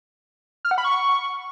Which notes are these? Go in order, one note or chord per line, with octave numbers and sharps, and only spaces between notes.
F6
F#5
B5
C#6